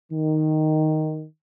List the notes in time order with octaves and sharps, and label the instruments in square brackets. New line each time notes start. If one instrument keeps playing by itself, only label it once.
[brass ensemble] D#3